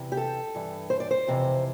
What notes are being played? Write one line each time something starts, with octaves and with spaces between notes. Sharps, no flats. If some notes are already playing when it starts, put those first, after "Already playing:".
Already playing: E2 C3 E3
G4
A4
G2 E3
C5
D5
C5
F2 C3 E3